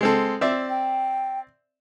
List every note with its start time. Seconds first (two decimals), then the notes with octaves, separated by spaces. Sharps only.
0.01 G#3 C4 A4
0.41 C4 D5 E5
0.70 G5